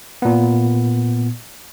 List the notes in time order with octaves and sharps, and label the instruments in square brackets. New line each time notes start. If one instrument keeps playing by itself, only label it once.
[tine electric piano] A#2 B3